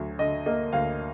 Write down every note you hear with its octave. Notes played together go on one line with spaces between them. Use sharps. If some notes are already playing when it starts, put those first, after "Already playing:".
Already playing: D2 F#3
D3 D#5
A#3 D#5
D2 F5